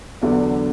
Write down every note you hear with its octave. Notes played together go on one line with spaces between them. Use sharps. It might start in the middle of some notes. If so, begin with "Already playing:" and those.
E2 D3 F#3 B3 D4